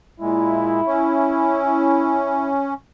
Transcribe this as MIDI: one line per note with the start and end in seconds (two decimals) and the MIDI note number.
0.21 0.81 46
0.21 0.81 56
0.21 2.53 64
0.87 2.74 61